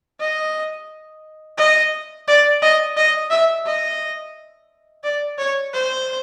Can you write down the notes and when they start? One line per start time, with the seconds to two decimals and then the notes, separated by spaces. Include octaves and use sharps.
0.20 D#5
1.58 D#5
2.28 D5
2.62 D#5
2.97 D#5
3.30 E5
3.66 D#5
5.04 D5
5.38 C#5
5.73 C5